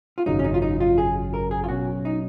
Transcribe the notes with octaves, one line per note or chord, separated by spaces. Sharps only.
F4
G#1 F#2 C#3 F#3 D#4
C#4
D#4
F4
D#4
F4
G#4
A#4
G#4
F4
B2 F#3 C#4 F#4
D#4